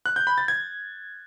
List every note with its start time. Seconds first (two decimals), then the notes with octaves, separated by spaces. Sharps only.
0.06 F#6
0.16 G6
0.27 B5
0.38 A6
0.48 G#6